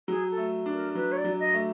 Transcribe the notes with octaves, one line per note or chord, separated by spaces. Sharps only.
F#3 G#4
A4
A3
D4
A#4
F#3 B4
C#5
D5
F#3
D#5
A3